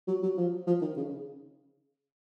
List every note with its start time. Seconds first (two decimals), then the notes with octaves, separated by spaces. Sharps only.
0.08 F#3
0.23 F#3
0.37 F3
0.67 F3
0.82 D#3
0.97 C#3